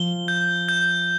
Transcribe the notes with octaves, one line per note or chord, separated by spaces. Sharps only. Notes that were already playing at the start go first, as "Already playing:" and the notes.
Already playing: F3 G7
G6
G6